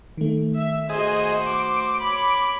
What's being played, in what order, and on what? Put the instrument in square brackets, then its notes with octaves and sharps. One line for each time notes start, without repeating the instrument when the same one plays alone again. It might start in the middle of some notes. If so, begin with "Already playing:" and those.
[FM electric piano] D#3 A3
[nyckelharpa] E5
[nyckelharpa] F#4 C5 [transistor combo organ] G#4 D#5
[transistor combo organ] D6
[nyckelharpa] C#5 B5